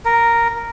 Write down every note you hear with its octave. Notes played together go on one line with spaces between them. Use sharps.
A#4